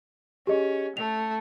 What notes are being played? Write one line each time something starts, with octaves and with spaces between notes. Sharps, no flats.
C#4 G4 G#4 D#5
A3 F7